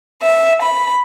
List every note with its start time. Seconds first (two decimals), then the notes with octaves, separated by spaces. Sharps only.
0.23 E5
0.63 B5